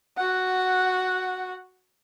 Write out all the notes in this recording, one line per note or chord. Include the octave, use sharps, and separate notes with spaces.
F#4 F#5